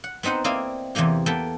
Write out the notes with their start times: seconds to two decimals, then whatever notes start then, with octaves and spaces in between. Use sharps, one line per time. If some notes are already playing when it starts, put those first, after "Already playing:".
0.04 F#5
0.23 B3 C4 D#4 C5 F#5
0.44 A#3 C4 E4 D5 D#5 F5
0.95 E2 C3 E3 A#3 G4
1.26 A#3 B3 A4 G5 A5